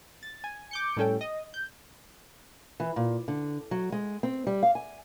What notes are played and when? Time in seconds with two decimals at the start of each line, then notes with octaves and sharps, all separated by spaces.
0.23 A6
0.44 G#5
0.71 D6 G6 C#7
0.97 A2 G3 C#4 A4 G5
1.21 D#5
1.54 G6
2.80 E3
2.96 A#2
3.28 D3
3.71 F#3
3.92 G#3
4.23 C4
4.47 G3
4.63 F5
4.75 G#5